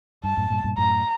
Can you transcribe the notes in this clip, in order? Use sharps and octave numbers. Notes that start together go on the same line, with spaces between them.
G2 A5
F#2 A2
G2 A#2
G2 A#2
F#2 A2 A#5